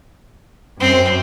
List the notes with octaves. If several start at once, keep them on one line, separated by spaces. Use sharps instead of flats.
F#2 C4